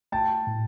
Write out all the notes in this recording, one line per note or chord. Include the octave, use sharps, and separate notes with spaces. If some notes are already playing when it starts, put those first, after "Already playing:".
A3 G5 A5
A2